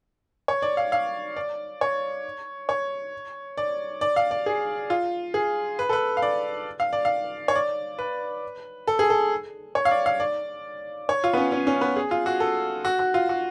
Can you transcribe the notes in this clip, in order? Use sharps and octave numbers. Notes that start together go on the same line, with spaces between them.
C#5
D5
F5
F5
D5
C#5
C#5
D5
D5
F5
D5
G#4
F4
G#4
B4
A4
B4
F5
D5
F5
D5
F5
C#5
D5
B4
A4
G#4
A4
C#5
F5
D5
F5
D5
C#5
F4
B3
C#4
C#4
C#4
B3
G#4
F4
F#4
A4
F#4
F#4
F4
F#4